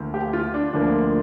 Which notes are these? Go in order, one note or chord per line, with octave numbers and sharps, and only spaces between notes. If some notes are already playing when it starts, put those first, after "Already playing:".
Already playing: D2 D3 F3 A#3
G4
F4
D4
D2 D3 F3 A#3 D4